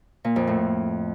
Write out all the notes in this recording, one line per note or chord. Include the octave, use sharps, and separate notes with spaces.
A#2
F2
A2